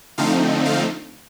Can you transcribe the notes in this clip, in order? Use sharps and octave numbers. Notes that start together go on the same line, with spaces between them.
D3 F3 A3 C4 D#4 F5
F5